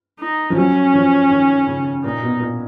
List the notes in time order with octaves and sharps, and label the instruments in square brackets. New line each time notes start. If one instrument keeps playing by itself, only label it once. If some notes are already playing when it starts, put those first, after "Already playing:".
[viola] D#4
[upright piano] F3
[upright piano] F#3 [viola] C#4
[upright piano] F3
D#3
C#3
[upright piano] A#2 [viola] D#4
[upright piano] B2
A#2